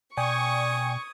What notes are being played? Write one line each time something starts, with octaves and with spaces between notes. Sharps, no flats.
B2 D5 G5 G#5 C#6 D#6 G#6